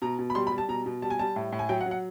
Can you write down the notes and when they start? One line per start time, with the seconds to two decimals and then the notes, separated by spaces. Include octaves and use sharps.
0.02 B2 A#5
0.19 B2
0.30 B5
0.35 G3 C6
0.47 B5
0.52 G3
0.58 A5
0.69 B2 A#5
0.86 B2
1.02 G3 A5
1.10 G#5
1.19 G3 A5
1.36 A2
1.52 A2
1.59 G#5
1.69 F#3 G5
1.81 F#5
1.86 F#3
1.91 F#5